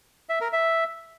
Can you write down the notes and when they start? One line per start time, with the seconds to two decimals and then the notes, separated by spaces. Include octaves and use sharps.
0.29 E5
0.41 A#4
0.53 E5